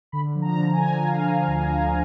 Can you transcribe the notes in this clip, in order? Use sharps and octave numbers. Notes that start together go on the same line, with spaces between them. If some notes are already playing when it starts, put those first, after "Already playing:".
D3 B5
F3
A#5
D3
G#5
D3
D3 F5
F3
D2
F3